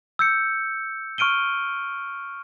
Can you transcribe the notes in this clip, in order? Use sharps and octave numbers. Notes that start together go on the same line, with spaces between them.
E6 G6 C#7
C#6 F6 D7 D#7 G7